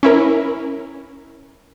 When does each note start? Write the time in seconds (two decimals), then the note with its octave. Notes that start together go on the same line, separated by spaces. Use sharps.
0.03 C#4 E4 A#4